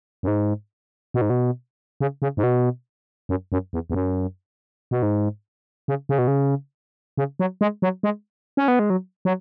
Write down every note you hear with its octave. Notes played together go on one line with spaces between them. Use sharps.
F#2
G#2
B2
G#2
B2
C#3
C#3
G#2
B2
F#2
F#2
E2
E2
F#2
B2
G#2
C#3
C#3
B2
C#3
C#3
F#3
G#3
F#3
G#3
C#4
B3
G#3
F#3
F#3